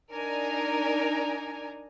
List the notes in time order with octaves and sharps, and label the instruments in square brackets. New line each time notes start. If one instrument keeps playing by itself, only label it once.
[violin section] D4 D#4 A#4 G#5 A#5